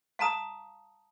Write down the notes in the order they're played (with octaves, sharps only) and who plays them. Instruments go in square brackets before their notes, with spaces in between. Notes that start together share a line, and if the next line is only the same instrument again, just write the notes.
[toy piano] F5 A5 A#5 D#6